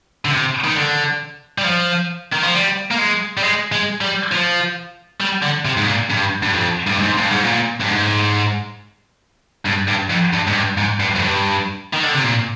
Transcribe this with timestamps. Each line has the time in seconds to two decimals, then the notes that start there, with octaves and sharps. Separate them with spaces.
0.25 D3
0.31 C3
0.64 D#3
0.75 D3
1.58 G3
1.64 F3
2.32 D#3
2.43 F3
2.54 G3
2.91 A#3
2.98 G#3
3.37 G3
3.43 G#3
3.72 G#3
4.01 G3
4.32 F3
5.21 G3
5.43 D3
5.65 C3
5.78 G#2
5.87 A#2
6.10 G2
6.43 G2
6.54 F2
6.87 G2
6.99 G#2
7.18 G2
7.30 G#2
7.43 A#2
7.80 G2
7.88 G#2
9.66 G2
9.88 G2
10.10 F2
10.33 G2
10.48 G#2
10.55 G2
10.78 G#2
11.00 G2
11.15 F2
11.22 G2
11.93 D#3
12.03 D3
12.13 C3
12.23 A#2